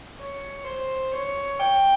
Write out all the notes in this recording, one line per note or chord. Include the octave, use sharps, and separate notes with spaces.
C#5
C5
C#5
G5